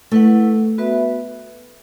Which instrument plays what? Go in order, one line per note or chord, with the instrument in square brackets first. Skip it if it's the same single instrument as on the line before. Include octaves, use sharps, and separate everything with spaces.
[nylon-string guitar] A3 [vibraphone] E4 B4 F#5
[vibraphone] B3 F#4 B4 E5